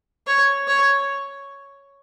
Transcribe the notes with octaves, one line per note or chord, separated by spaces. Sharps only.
C#5
C#5